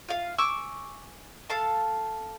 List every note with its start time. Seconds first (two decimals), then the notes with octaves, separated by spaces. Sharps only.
0.08 F4 F5
0.38 G#5 C#6 D6 E6
1.50 A4 F5 A5